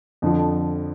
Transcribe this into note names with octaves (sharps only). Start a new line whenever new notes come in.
F2 D3 F3